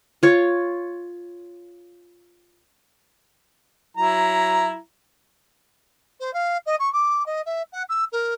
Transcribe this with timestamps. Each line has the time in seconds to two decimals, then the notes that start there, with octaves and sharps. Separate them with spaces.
0.23 F4 C#5
3.97 F#3 E4 A#5
6.20 C5
6.33 F5
6.66 D#5
6.79 C#6
6.93 D6
7.26 D#5
7.46 E5
7.72 F#5
7.89 E6
8.12 A#4